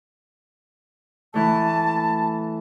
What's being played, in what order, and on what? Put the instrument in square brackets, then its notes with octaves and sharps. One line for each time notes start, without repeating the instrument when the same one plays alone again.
[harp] E3 A3 [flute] A5